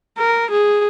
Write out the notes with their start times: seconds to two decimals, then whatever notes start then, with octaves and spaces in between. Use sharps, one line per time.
0.18 A#4
0.51 G#4